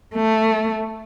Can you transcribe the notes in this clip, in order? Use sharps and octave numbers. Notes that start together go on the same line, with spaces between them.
A3